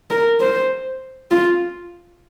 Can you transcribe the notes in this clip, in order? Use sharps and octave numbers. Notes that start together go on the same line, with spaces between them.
A#4
C5
F4